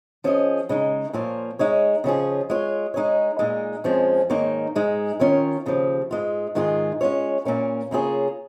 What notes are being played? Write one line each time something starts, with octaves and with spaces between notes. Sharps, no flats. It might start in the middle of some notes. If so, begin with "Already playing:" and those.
F3 C#4 G#4 D#5
C#3 G#3 D#4
A#2 F3 A#3 F4 C#5
G#3 D#4 C#5
C#3 F3 C#4 F4 G#4
G#3 F4 C#5
G#3 D#4 G#4 C#5
A#2 G#3 D#4
F2 F3 G#3 C#4
G#2 D#3 A#3 D#4 C#5
G#2 G#3 D#4
D#3 C#4 F4 A#4 C#5
D#2 C#3 F3
G#2 G#3 F4
G#2 D#3 G#3 F4 G#4
G#3 C#4 F4 C#5
A#2 A#3 C#4 A#4
C#3 A#3 F4 G#4 C#5